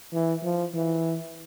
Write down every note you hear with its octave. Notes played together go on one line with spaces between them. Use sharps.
E3
F3
E3